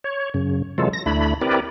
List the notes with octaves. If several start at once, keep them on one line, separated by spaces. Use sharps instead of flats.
C#5
F#2 C#3
C3 E3 F#3 G#3 F4 A4
A#6
D2 A3 D4 E4 B5
C4 E4 G4 A#4 B4 D5